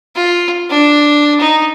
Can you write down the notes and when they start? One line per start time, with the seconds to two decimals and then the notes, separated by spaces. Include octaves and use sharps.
0.16 F4
0.70 D4
1.40 D#4